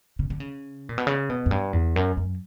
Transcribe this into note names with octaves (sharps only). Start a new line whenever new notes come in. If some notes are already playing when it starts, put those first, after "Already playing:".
C#3
D3
C#3
A#2
B2
C#3
B2
F#2
G2
E2
F#2
F#2